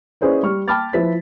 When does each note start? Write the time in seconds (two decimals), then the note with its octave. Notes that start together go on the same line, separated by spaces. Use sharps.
0.21 C#4 E4 G#4 B4 C5 D5
0.43 G3 G4 C#6 F6
0.68 G5 A5 B5 D6 F6 A6
0.93 F3 E4 B4 C5 B6